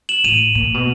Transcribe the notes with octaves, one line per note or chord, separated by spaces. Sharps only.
E7 F#7
A2 D#7 F7
A#2
B2